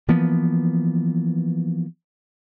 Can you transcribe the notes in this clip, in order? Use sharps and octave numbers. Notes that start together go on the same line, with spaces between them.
E3 F3 A#3 B3